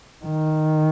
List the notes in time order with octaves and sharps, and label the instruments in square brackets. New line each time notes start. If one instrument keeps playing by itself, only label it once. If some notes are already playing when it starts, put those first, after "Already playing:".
[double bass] D#3